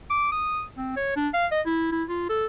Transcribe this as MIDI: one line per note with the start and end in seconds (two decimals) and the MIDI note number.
0.10 0.31 86
0.32 0.64 87
0.77 0.94 60
0.96 1.14 73
1.16 1.29 62
1.33 1.46 77
1.51 1.61 75
1.66 1.89 64
1.92 2.03 64
2.09 2.28 65
2.29 2.46 69